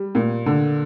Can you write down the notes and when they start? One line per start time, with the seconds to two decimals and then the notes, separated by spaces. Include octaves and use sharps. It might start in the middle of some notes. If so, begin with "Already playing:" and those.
Already playing: G3
0.15 A#2
0.46 D3